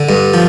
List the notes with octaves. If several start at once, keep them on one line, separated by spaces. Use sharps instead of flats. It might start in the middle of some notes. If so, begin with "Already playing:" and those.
Already playing: D3
G2
F3